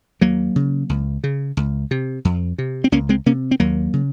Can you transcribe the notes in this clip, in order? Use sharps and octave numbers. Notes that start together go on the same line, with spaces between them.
D#2 F#3 A#3
C#3
C#2
C#3
C#2
C3
F2
C3
C4
C#2 A#3 C#4
G#3 C4
C3 A#3 C#4
C4
D#2 F#3 A#3
C#3